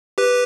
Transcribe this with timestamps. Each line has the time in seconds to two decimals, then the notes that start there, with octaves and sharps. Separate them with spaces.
0.18 G4 B4